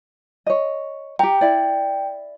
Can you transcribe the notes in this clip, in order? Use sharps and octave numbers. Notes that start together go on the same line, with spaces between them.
C#5 D#5
G4 G5 A#5
E4 D5